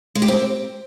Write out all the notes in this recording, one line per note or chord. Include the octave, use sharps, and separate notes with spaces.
G#3
G4
C4